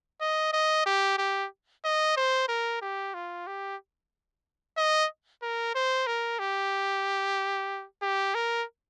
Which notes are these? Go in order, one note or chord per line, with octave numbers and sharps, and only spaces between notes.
D#5
D#5
G4
G4
D#5
C5
A#4
G4
F4
G4
D#5
A#4
C5
A#4
G4
G4
A#4